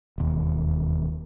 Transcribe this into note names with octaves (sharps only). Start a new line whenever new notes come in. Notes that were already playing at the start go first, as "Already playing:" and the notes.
E1 D#2